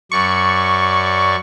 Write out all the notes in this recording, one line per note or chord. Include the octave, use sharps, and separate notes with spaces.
F#2 D5 C#6